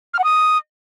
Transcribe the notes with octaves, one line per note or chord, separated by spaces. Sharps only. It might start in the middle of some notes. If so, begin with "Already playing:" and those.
F6
F#5
D#6